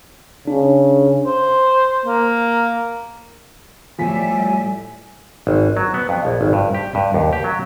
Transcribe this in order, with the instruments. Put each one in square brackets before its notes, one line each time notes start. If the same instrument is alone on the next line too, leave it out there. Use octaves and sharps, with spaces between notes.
[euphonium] C#3 [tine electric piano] D4
[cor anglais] C5
A#3
[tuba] A2 [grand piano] F3 B6 [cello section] G3 E5 [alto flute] G#5
[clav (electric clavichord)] G#1
F#3
B3
F2
A#1
G#1
G2
G4
G2
D#2
G4
F#3